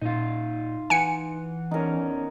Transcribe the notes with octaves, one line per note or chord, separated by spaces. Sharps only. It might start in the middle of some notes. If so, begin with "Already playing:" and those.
A#2 D#4 F4
E3 F#5 G#5 C#7
E2 C#4 D#4 A#4